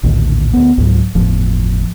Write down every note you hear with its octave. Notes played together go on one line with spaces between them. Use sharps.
A#1 D#2 A2 D3
D2 B3
C#2 G#2 F#3
G1 E2 A2 F3